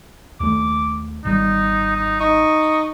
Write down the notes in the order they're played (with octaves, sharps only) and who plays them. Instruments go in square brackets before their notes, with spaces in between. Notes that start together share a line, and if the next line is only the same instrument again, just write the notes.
[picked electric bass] D#2 A3 [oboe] D6
[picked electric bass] G#1 G3 [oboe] D#4
[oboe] D#4
[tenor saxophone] D#4 [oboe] C#6